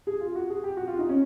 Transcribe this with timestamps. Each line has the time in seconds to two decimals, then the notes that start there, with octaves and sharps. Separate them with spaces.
0.07 G#4
0.21 F4
0.35 F#4
0.50 G#4
0.64 G4
0.77 F#4
0.87 F4
0.99 D#4
1.09 C#4